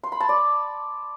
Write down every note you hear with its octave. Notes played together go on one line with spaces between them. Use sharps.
C6
B5
A5
D5